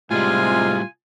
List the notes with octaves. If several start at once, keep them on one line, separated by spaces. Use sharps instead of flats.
A2 C3 G3 G#3 F4 G#5